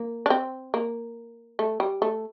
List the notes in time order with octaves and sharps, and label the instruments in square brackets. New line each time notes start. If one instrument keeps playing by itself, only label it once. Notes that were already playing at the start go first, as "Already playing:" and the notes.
Already playing: [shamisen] A#3
D4
C4
A#3
A3
G3
A3